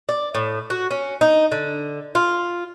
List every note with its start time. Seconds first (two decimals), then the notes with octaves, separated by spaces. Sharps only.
0.09 D5
0.35 A2
0.70 F#4
0.91 C#4
1.21 D#4
1.52 D3
2.15 F4